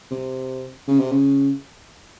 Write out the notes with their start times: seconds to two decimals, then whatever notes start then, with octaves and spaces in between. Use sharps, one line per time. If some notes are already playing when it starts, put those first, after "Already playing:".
0.11 C3
0.88 C#3
1.00 C3
1.12 C#3